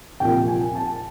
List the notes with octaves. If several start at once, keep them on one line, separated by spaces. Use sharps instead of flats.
C2 A#2 F3 G5
G#5
A5